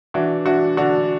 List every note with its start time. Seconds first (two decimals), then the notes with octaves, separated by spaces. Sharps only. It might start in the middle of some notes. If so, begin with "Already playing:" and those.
0.14 E3 D4 F#4
0.46 E3 D4 F#4
0.77 D3 D4 F#4